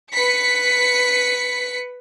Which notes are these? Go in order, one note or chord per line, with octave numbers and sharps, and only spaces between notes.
B4 B6 C#7